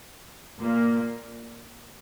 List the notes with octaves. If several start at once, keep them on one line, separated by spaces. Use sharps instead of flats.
A#2 A#3